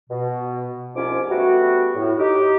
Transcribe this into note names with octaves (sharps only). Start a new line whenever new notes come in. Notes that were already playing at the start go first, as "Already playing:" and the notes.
B2
C2 G#2 F3 C#4 F4 D6
G3 A3 B3 F#4
A2
D#4 G4